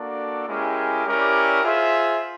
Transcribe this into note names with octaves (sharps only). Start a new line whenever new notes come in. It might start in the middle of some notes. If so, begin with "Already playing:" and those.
Already playing: A#3 D4 F#4 A4 D5
G#3 C#4 E4 G4 A#4
C#4 E4 G4 A#4 D5
F4 G#4 C5 E5